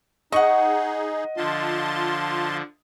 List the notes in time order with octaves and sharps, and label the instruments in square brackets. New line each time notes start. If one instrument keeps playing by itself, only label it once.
[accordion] D#4 G#4 [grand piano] D#5 [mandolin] F#5 C#6
[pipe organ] D3 F3 [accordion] F4 A5 C6